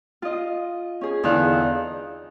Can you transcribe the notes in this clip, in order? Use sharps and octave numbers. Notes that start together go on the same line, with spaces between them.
F4 D#5
C#4 G#4
E2 D3 D#4 E4 F5 F#6
D#4